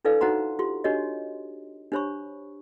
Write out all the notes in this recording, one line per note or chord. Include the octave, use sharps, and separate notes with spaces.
D4 E4 A4 B4 D5 F5
D#4 F#4 C5 F#5 A#5 C6
F4 G4 C6
D4 F#4 G4 C#5 D#5
D4 G4 C5 C#5 B5 C#6